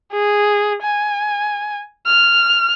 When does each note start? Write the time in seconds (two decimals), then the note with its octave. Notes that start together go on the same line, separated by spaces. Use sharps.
0.13 G#4
0.83 G#5
2.07 F6